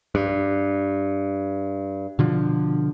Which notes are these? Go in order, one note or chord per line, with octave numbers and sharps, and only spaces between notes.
G2
B2 D3 F3